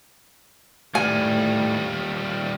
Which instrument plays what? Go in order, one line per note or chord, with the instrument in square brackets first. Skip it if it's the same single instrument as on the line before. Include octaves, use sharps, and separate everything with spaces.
[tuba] A2 [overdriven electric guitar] D#3 G3 [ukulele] G#5